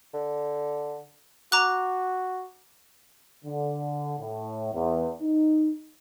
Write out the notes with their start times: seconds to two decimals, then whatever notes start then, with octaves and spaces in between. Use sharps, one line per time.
0.14 D3
1.52 F#4 A#5 D6 F#6
3.45 D3
4.19 A2
4.73 E2
5.22 D#4